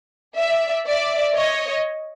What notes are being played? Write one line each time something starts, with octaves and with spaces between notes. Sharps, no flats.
D5 E5
D5 E5
C#5 D#5